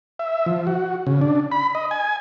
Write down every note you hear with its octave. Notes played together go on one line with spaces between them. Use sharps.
E5
F3
F#4
C#3
D4
B5
D#5
G#5